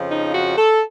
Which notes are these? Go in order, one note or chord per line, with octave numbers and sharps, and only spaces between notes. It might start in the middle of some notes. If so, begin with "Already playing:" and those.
Already playing: F2 C#3 F3
D#4
F#4
A4